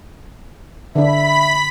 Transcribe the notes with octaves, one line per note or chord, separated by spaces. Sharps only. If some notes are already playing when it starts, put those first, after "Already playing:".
D3 D4 E5 B5 B6